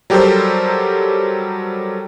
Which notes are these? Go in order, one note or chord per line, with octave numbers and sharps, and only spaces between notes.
F#3 G3 G4 A4 A#4 C5